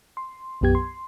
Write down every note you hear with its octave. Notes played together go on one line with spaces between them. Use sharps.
C6
B1 F#2 B3 G4 G#6
C6